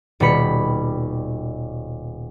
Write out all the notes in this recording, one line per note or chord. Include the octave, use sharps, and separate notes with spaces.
D#1 B2 G3 B5 C#7